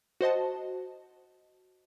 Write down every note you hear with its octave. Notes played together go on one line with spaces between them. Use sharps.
F#4 C5 D#5 A5